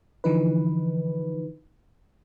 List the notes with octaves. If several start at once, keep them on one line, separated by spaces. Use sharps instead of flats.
D3 E3 F3 D#4 B4